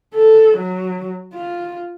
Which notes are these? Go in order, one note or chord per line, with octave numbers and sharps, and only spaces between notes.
A4
F#3
F4